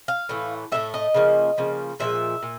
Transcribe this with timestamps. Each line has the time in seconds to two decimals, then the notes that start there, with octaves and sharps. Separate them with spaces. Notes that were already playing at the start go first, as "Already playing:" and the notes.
0.08 F5
0.29 A2 E3 A3
0.72 A2 E3 A3 E5
0.94 D#5
1.14 C#3 F3 A#3
1.58 C#3 F3 A#3
2.00 A#2 F3 G#3 E5
2.42 A#2